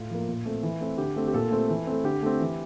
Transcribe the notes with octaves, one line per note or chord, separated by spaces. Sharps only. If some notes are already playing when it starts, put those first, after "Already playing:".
Already playing: A2 F4
F3 A#3
A#2
A3 C4
E3
A3 C4
D3 G4
A3 C4
G4
A#2 A4
A3 C4
E3
A3 C4
D3 G4
A3 C4
E3